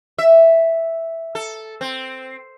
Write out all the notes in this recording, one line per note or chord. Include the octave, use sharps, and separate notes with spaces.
E5
A4
C4